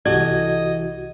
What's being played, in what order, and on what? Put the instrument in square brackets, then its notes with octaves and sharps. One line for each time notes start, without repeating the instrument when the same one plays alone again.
[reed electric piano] C2 F#4 G#6 [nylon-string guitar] E3 G4 A4 [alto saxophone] D#5